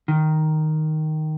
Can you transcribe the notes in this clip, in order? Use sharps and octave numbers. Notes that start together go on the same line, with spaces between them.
D#3